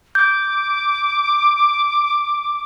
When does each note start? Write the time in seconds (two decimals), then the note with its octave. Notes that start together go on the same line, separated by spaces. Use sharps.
0.15 D6 G6